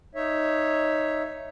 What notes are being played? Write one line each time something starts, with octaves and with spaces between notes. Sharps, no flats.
D#4 C#5 E5